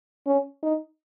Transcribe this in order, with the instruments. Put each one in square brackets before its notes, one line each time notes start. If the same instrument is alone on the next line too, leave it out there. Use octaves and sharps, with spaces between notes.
[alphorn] C#4
D#4